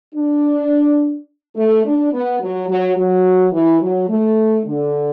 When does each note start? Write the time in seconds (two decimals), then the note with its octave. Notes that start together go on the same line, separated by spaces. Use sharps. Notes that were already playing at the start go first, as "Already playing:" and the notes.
0.15 D4
1.56 A3
1.85 D4
2.13 B3
2.41 F#3
2.69 F#3
2.96 F#3
3.53 E3
3.81 F#3
4.09 A3
4.66 D3